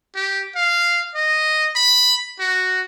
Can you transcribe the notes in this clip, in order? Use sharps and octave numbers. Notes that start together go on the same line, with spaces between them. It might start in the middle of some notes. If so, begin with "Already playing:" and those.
G4
F5
D#5
B5
F#4